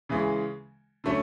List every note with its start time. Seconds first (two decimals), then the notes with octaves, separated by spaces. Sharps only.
0.09 C#3 E3 G#3
1.04 D3 F#3 A3 C#4